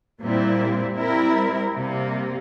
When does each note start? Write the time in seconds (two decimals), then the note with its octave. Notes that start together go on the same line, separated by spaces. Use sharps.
0.21 A#2 G3 C4 E4
0.98 G3 C4 E4 A#4
1.74 C3 G3 A#3